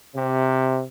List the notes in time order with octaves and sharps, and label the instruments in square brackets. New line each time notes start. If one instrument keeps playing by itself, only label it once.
[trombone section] C3